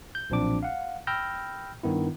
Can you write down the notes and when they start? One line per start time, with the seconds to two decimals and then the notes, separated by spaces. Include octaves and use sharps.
0.15 G6
0.30 B1 A#2 F3 C4 D4 D6
0.63 F5 F#5
1.07 G5 B5 E6 F6 G6 A#6
1.83 G2 D#3 B3 E4